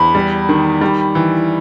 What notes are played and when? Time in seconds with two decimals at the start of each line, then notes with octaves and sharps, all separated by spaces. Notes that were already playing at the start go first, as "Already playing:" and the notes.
Already playing: E2 B5
0.15 G3
0.49 D#3
0.81 G3
1.15 E3